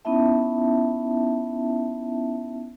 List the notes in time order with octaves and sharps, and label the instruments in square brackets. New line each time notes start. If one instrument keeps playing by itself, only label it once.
[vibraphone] B3 C#4 D#4 E4 E5 A5